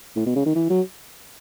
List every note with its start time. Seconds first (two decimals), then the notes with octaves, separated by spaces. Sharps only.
0.16 A2
0.26 B2
0.36 C#3
0.46 D#3
0.56 E3
0.70 F#3